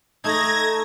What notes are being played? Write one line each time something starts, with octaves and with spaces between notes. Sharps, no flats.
A3 D#4 G#6 A#6